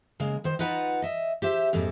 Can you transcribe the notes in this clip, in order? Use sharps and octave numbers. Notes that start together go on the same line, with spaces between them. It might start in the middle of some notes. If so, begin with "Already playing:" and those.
C#3 G#3 A#3
D#3 C5
D#4 F4 B4 F#5 A5 A#5
D#5 E5
G4 C5 E5
F2 G#2 A#3 A4